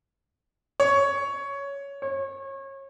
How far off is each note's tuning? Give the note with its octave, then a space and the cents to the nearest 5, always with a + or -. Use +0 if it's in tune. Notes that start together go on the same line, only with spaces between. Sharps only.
C#5 +10
C#5 -30